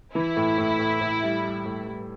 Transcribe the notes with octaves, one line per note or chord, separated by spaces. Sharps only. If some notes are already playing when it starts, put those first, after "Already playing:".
E3 E4
A2
A2
A2
A2
G3
G3
A2
G3